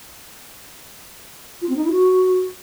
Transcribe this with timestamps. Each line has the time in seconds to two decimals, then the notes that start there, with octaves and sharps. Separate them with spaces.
1.61 F4
1.69 C4
1.76 D#4
1.84 E4
1.91 F#4